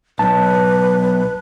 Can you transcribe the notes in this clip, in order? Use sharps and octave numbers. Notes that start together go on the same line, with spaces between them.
B1 B4 A5